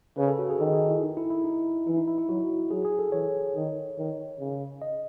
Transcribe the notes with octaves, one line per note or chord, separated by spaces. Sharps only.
C#3 B4
A4
F#4
G#4
D#3 A4
G#4
E4
D#4
E4
E4
D#4
E3 E4
D#4
E4
E4
F#3 F#4
F#3 G#4
G#4
A4
E3 C#5
D#3
D#3
C#3
D#5